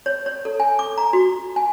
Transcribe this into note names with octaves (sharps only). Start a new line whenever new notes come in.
C#5
C#5
A4
G#5
D6
A#5
F#4
G#5